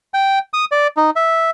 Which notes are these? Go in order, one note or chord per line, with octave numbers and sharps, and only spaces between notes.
G5
D#6
D5
D#4
E5